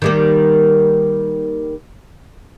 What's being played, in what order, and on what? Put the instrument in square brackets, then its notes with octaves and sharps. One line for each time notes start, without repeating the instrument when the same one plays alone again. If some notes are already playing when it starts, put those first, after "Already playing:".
[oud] D#3 G3 A#3